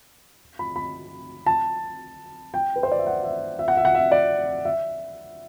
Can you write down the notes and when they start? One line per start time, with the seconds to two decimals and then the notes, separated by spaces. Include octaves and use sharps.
0.59 B5
0.76 B5
1.46 A5
2.54 G5
2.76 B4
2.83 C5
2.92 D5
2.99 E5
3.07 F#5
3.24 E5
3.59 E5
3.68 F#5
3.77 E5
3.85 F#5
3.95 E5
4.12 D5
4.65 E5